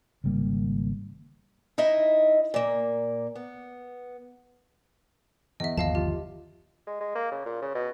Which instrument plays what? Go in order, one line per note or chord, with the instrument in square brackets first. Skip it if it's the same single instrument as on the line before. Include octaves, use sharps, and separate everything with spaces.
[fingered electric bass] G#1 C#3 G3 A#3
[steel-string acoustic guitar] D#4 E4 D#5 E5
A#2 A#3
B3
[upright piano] E2 [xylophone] D#5 E5
[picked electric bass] G1 D#2 F3 [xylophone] D#5 F5 A5
[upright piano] F4 [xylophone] G4
[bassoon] G#3
G#3
A#3
C#3
A#2
C#3
B2